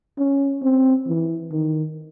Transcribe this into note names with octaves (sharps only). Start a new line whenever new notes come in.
C#4
C4
E3
D#3